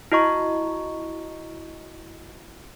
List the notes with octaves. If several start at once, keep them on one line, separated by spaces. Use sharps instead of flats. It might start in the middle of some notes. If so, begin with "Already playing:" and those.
E4 F#4 D#5 A#5 C#6